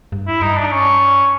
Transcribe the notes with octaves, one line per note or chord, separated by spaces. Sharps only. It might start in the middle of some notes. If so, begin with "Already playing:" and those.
G2
E4
G2 D#4
D4
C#4